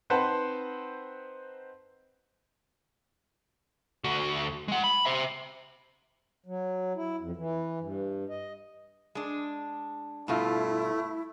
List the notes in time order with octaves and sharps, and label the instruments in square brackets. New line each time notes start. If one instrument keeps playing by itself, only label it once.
[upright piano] C4 D#4 B4 C5 F#5 A5
[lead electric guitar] D2 F#4
G#3 F#5
B5
C5 E5
[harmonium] F#3
E4
F2
E3
G2
D#5
[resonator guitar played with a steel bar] G#3 D4
[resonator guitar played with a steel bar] G2 B2 F4 [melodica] A3 [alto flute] E4